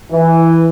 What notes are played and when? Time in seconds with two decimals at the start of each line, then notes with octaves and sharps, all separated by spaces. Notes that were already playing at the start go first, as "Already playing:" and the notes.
0.11 E3